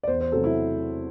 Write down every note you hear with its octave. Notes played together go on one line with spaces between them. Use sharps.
D5
E2 C5
C5
C3 F#3 A3 A4
E4